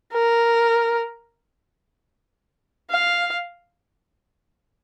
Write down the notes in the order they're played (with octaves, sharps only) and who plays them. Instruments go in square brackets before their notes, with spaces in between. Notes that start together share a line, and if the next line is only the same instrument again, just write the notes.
[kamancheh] A#4
F5